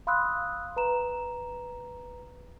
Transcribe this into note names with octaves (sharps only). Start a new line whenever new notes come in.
F5 B5 C6 D#6 E6 F#6
B4 A#5 E7